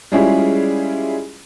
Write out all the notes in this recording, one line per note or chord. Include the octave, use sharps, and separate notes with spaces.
G3 G#3 C#4 E4 F4 G#4